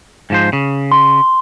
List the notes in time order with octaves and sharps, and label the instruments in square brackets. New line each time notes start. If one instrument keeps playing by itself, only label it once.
[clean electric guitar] G#2 F3 C5
C#3
[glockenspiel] C6